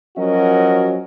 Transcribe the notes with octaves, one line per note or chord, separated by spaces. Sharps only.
F3 F#3 C#4 F#4 A#4 D#5